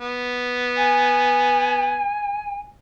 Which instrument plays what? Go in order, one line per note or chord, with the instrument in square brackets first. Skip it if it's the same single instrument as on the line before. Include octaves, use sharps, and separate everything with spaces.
[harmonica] B3
[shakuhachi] G#5